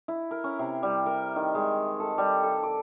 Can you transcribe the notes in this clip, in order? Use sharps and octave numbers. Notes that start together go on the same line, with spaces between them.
E4
A#4
C#4
C3
G3
A#4
D#3
G#3
A4
G3
A4
D6